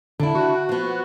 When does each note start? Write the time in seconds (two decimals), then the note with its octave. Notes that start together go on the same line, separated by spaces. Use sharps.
0.20 D3 D4 E4
0.35 F#4
0.69 F3 B3